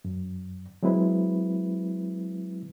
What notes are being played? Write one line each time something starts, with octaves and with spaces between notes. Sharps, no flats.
F#2
F#3 G#3 C4 E4 B4